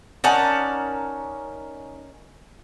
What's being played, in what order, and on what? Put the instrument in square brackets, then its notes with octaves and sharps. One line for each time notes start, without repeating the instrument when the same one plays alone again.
[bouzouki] C#4 A#4 D5 [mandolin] D#4 F#5 A5